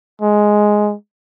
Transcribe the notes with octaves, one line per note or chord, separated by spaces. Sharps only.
G#3